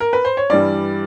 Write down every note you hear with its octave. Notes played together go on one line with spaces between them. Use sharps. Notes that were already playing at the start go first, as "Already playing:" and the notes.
A#4
B4
C5
C#5
G2 E3 G3 D5